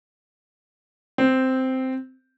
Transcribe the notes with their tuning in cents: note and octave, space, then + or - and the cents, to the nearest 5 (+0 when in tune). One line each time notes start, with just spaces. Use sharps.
C4 -5